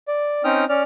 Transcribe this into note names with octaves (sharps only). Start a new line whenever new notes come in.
D5
C4 C#4 D#4 G5 D#6 F6
C#4 D5 F6